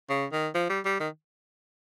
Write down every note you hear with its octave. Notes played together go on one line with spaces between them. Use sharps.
C#3
D#3
F3
G3
G3
D#3